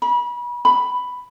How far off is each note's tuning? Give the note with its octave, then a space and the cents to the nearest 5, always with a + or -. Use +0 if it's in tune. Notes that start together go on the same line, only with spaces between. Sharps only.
B5 -30
B5 +5